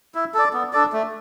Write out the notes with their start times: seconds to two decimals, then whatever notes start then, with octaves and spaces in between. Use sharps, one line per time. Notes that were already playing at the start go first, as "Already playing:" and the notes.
0.15 E4
0.34 A4 D5
0.53 B3
0.73 D4 A4 D5
0.93 A3